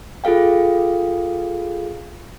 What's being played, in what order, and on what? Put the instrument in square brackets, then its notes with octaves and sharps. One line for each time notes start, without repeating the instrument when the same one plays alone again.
[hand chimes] F4 G#4 A4 F5 G5